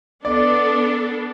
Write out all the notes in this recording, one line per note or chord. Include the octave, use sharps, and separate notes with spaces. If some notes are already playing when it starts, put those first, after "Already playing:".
B3 D4 A4 D5